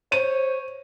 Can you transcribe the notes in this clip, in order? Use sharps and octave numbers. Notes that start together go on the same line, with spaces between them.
C5 C#5 D#7